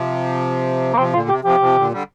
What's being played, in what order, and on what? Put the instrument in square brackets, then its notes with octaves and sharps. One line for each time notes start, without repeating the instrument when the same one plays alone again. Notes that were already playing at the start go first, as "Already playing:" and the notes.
Already playing: [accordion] C3 F3
[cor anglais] A#3
[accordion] C3 F3 [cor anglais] C4
[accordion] A#2 D3 [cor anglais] F4
[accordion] C3 [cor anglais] G4
[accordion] C3 F3 [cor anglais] G4
[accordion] C3 F3
A#2 D3
D3 G3